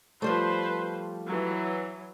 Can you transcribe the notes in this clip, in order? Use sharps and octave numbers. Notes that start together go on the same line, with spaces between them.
F3 G3 A3 B4 C5
E3 F#3